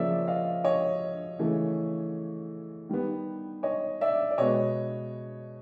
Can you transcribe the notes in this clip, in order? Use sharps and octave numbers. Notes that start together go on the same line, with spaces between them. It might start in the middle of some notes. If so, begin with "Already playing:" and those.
Already playing: C#3 F3 A#3 D5 E5
D#5 F5
C#5 D#5
C#3 E3 A3
D#3 G3 B3
C#5 D#5
D5 E5
D5
B2 G#3 B3 C#5 D#5